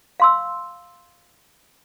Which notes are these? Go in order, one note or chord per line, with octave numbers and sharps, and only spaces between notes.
F5 C6 E6